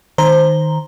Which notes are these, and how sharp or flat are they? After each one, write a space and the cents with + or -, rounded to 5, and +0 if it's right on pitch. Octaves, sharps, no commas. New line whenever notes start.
D#3 +0 C5 +0 A#5 +0